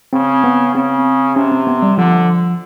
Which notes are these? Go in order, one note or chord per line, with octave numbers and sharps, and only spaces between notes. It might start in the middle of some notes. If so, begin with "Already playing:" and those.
C#3 C4
B3
C#3 C4
C3 C#4
C4
B3
G3
D3 F3